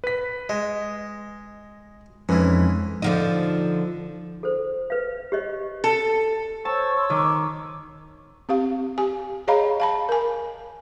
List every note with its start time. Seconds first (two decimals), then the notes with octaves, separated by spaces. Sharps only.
0.04 B4 B6
0.49 G#3 D#5
2.29 F2 G#2 E3 C#4 B4
3.02 D3 F3 D#4
4.43 A4 C5
4.90 B4 F5
5.32 G4 C#5 D#5
5.84 A4 A5
6.65 C5 C#5 A5 C#6 E6
6.97 C6
7.10 D#3 D6
8.49 C4 G4 F5
8.98 G4 G#5
9.48 G#4 C#5 D#5 F5 A#5 B5
9.80 F5 A5 B5
10.09 A#4 G#5